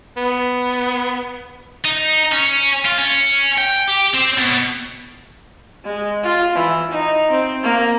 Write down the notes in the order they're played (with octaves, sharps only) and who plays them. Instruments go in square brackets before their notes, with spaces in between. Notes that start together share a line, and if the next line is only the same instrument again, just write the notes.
[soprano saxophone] B3
[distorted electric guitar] D#4
C#4
F4
C#4
G5
G4
C4
B2
[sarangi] G#3
F4
E3
D#4
C4
A#3